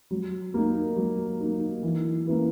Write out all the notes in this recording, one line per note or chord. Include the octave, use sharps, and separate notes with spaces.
F#3
A#3 D#4
F#3
A#3 D#4
E3
A#3 C#4 E4 B4